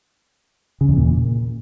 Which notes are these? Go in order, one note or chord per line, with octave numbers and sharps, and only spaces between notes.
C#3
E2
A#2